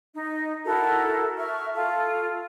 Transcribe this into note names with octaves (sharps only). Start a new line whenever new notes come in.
D#4
E4 F#4 A4 A#4
E5 C#6 F6
F4 A4